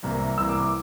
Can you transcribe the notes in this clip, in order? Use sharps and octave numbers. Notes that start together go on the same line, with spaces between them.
C2 C3 E3 A#3
C2 C3 E3 A#3 E6
D6
D6